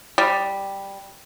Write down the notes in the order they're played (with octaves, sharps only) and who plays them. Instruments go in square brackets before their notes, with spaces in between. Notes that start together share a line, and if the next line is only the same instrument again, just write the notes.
[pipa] G3